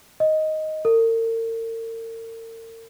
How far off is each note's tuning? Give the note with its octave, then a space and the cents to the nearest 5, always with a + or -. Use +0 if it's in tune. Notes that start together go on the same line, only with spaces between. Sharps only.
D#5 +5
A#4 -45